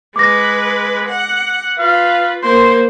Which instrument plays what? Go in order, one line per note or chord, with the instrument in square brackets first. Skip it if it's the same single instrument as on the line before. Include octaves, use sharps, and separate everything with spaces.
[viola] G#3 B4 [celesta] D6 A#6
[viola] F#5
[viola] F4 B4 [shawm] F5
[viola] A#3 C5 [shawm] C6